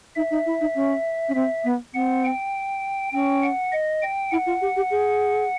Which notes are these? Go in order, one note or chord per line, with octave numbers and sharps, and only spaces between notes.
D#4 E5
D#4
E4
D#4
C#4
C#4
C4 E5
B3
C4 F#5
G5
C#4 G5
F#5
D#5
G5
E4 F#5
F4
G4
G4
G#4